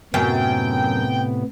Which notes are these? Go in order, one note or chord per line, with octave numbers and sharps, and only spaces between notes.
F#2 A2 C3 B3 G5